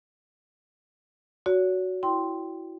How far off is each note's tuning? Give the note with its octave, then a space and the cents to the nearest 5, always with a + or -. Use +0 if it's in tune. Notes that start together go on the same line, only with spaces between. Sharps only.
F#4 +0 C#5 +40
E4 +0 G5 -5 C6 +0